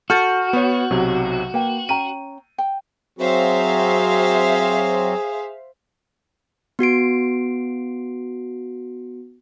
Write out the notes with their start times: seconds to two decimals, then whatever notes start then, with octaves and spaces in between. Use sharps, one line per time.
0.10 F#4 A4 F6 G6 A6
0.53 B3 C#5
0.91 B1 C3 F#3
1.54 A#3 B4 G5
1.89 C#4 G5 A#5 D#7
2.58 G5
3.19 F#3 C4 F#4 G#4 C5 E5 F5
6.79 B3 F#4 C7 D7